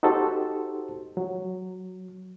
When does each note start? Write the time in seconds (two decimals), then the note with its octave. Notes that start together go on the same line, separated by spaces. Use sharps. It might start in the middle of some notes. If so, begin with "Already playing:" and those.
0.03 D#4 F#4 G4 A4 C5
1.17 F#3